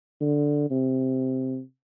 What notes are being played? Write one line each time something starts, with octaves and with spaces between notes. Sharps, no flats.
D3
C3